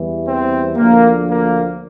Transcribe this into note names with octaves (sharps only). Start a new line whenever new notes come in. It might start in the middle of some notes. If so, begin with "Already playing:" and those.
Already playing: E2 E3 G3
C4
D2 D3 F3 A#3
A#3